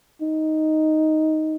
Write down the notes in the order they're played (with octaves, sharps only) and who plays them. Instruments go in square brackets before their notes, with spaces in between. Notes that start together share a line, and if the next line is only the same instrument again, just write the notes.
[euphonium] D#4